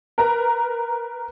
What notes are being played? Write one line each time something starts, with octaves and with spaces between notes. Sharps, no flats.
A#4 B4 A#5